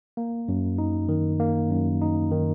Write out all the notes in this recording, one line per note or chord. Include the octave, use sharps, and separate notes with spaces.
A#3
F#2
D#4
D#3
A#3
F#2
D#4
D#3